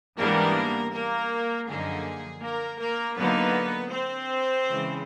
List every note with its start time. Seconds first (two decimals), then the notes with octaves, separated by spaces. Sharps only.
0.18 G#2 E3 G3 A#3 B3 D4 A#4
0.93 A#3 A#4
1.68 F#2 D3 F3 A#3 D#4 G#4
2.42 A#3 A#4
2.80 A#3 A#4
3.17 D3 F#3 A#3 B3 D#4 B4
3.92 C4 C5
4.67 C#3 E3 G#3